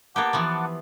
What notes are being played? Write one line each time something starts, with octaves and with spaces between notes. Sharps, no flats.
A#3 B3 G4 F#5 A5 D6
E3 F3 B3